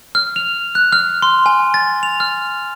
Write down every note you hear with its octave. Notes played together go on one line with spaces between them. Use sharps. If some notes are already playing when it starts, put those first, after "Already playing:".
F6
F7
F#6
F6
C6
G#5
A6
F7
F6